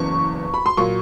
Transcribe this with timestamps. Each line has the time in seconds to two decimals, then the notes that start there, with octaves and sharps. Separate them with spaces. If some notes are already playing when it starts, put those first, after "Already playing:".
Already playing: F#1 E2 C#3 E3 C#6
0.54 B5
0.66 C6
0.77 A#2 F#3 C#6